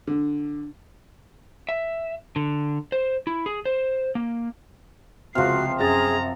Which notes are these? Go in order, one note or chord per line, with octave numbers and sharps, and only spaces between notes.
D3
E5
D3
C5
E4
G#4
C5
A#3
C#2 C3 F3 F#4 F6 C7
F#2 G#4 A#5 A6